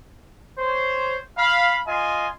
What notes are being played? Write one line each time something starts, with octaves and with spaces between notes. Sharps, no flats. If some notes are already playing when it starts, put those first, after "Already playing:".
C5 C#5
F5 B5
F4 D#5 G#5 C6